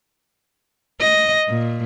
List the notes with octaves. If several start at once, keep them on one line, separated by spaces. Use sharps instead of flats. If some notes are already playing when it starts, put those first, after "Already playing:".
D#5
A#2